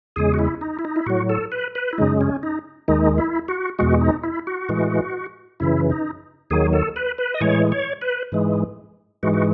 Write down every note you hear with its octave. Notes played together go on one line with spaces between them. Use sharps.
E2 C#3 G#3 G#4
F#4
E4
D#4
E4
D#4
E4
A2 F#3 F#4
A4
B4
B4
E4
F#2 C#3 G#3 D#4
C#4
D#4
D#2 D#3 G#3 D#4
E4
F#4
E2 B2 G#3 F#4
D#4
E4
F#4
A2 E3 G#3
F#2 C#3 E3 E4
D#4
D#2 D#3 F#3 G#4
A4
B4
B4
D#5
A2 E3 G#3 C#5
C#5
B4
G#2 E3 G#3
G#2 E3 G#3 F#4
F#4